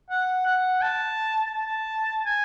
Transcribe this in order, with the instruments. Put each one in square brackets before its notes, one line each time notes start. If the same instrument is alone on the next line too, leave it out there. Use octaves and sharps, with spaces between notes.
[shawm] F#5
F#5
A5
A5
G#5